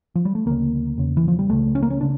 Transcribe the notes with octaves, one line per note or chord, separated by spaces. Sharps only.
F3
G3
A3
D2 C#3 A#3
E2 C#3
E3
F3
G3
C#2 C#3 A3
C#4
A#3
C#4
C#3 D4